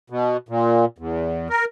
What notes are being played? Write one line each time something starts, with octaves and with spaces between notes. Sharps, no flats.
B2
A#2
E2
A#4